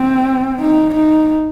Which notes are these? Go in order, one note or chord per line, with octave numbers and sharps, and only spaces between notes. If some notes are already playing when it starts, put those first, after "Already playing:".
Already playing: C4
D#4
D#4